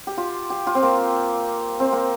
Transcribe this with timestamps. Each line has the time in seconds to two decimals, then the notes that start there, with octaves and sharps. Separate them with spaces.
0.07 G4
0.18 F4
0.50 G4
0.67 F4
0.75 C4
0.83 A#3
1.80 C4
1.92 A#3